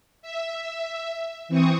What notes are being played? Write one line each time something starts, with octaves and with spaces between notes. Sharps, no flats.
E5
E3 C4 C#6 D#6